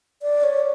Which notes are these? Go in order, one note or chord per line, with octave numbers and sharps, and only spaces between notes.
D5
C#5